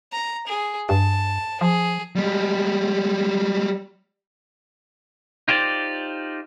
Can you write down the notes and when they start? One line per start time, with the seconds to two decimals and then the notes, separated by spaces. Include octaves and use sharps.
0.13 A#5
0.47 G#4
0.89 G2 A5
1.61 F3 G#4
2.16 G3 G#3
5.48 D#4 F4 G4 C5 D5